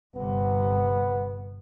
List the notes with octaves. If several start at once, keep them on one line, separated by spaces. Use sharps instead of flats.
G1 C3 B3